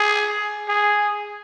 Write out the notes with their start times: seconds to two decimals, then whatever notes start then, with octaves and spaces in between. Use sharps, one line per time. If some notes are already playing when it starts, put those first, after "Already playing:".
Already playing: G#4
0.69 G#4